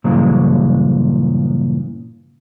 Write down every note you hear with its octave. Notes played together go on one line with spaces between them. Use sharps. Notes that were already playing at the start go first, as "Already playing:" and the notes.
G2 A#2 C#3 E3 F#3 G#3